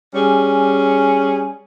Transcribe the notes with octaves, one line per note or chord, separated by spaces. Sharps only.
G3 C#4 G#4